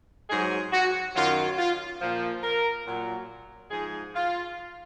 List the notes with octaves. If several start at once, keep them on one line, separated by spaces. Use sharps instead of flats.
G#2 F#3 G#4
F#4
F#2 D#3 F#3 F4
F4
A#2 F3
A#4
A#2 F#3
G#2 F3 G#4
F4